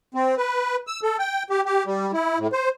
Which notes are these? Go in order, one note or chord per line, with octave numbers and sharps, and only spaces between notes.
C4
B4
E6
A4
G5
G4
G4
G3
E4
A2
C5